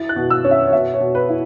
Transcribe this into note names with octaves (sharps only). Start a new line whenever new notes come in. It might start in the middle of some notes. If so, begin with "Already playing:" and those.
Already playing: E4 A6
F#6
B2
E6
C#4
E5
C#5
B2 E5
C#5
B2
B4
E4